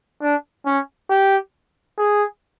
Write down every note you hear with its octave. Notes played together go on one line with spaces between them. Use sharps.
D4
C#4
G4
G#4